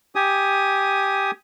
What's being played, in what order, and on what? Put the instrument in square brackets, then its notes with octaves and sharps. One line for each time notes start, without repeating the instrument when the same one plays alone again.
[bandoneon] G4 G#5 D#6